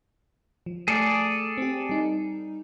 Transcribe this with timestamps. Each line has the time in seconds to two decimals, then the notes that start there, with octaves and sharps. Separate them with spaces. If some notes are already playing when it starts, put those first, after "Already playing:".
0.66 F3
0.88 A3 G#4 A4 D5
1.58 C4 G4
1.89 G3 D#4